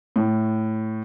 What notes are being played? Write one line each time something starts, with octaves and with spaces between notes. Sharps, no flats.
A2